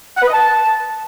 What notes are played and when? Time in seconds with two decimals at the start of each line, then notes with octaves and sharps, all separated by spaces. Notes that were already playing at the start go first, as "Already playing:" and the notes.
0.17 F#5
0.22 B4
0.28 D#5
0.33 A5